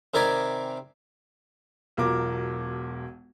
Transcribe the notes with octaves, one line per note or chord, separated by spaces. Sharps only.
C3 D#3 A#4 D5 G#5 B5
E1 B1 F4 A#4 D6